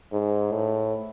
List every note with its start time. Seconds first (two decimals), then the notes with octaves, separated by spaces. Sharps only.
0.12 G#2
0.52 A2